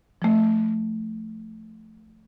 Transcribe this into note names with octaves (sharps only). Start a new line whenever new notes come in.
F3 A3